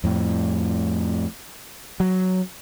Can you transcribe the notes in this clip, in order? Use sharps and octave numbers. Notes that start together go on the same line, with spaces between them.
F2 A2
F#3